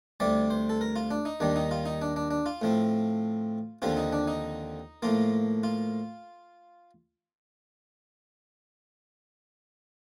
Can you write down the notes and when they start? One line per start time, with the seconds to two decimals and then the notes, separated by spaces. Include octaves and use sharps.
0.20 D2 C3 G3 D5
0.50 C5
0.69 A4
0.81 A#4
0.96 F4
1.11 D4
1.25 D#4
1.40 D#2 D#3 G3 D4
1.56 D#4
1.71 F4
1.86 D#4
2.02 D4
2.16 D4
2.31 D4
2.46 F4
2.62 A2 F3 C4
3.82 D#2 D3 F3 C4 F4
3.97 D#4
4.13 D4
4.28 D#4
5.02 A2 F3 A#3 F4
5.63 F4